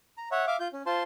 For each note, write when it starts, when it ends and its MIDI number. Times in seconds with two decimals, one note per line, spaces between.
0.18 0.29 82
0.31 0.45 73
0.31 0.45 76
0.31 0.45 78
0.47 0.57 76
0.47 0.57 77
0.47 0.57 86
0.60 0.68 65
0.60 0.68 91
0.73 0.82 61
0.86 1.03 65
0.86 1.03 72
0.86 1.03 81
0.86 1.03 84